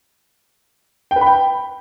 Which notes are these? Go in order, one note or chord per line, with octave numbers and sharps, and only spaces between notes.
G5
B4
B5
G5